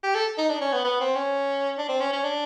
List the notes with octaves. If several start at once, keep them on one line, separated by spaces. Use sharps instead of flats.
G4
A4
D#4
D4
C#4
B3
B3
C4
C#4
D4
C4
C#4
C#4
D4